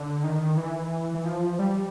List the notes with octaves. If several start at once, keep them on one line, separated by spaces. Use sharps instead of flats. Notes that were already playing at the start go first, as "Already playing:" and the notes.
Already playing: D3
D#3
E3
E3
F3
G3